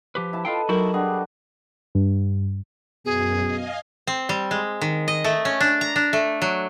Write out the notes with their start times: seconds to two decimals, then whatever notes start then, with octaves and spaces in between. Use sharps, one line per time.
0.15 F3 G4 B4
0.33 E4 A5
0.45 F4 A4 B4 D#5 F5 G5
0.69 F#3 D#4 E4 F#4 G4 A#4
0.94 G3 D4 F#4 G#4
1.95 G2
3.06 F#2 B2 G#4
3.43 D#5 F5 G#5
4.07 C4
4.29 G3
4.51 G#3
4.81 D#3
5.08 D#5
5.24 A3
5.45 C#4
5.60 D4
5.81 A#5
5.96 D4
6.13 A3
6.42 F#3